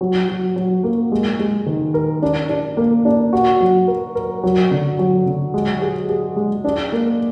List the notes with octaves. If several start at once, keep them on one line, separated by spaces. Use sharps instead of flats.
F#3
F#3
F#3
A#3
G#3
G#3
D#3
A#4
D4
D4
A#3
D4
F#4
F#3
A#4
A#4
F#3
D3
F#3
D3
G#3
G#4
G#4
G#3
D4
A#3